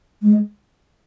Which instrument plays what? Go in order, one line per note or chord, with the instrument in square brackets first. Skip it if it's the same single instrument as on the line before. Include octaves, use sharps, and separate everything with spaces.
[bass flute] G#3